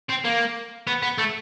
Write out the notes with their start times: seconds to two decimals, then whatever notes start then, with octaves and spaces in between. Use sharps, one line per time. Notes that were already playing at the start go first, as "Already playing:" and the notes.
0.10 C4
0.25 A#3
0.87 B3
1.02 B3
1.18 A3